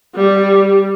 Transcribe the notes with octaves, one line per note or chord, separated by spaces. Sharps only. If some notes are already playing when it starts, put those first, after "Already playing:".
G3